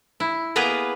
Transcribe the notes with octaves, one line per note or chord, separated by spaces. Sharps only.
E4
A#3 B3 G#4 B4 A#5